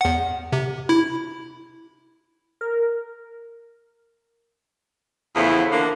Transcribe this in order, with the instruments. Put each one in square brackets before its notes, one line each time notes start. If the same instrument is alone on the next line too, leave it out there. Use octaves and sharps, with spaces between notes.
[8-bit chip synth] E2 F#5
C3
E4
[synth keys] A#4
[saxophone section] E2 C#3 F3 A3 E4
D3 E3 F3 A#3